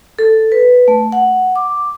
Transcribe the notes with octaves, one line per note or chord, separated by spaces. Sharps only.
A4
B4
A3
F#5
D6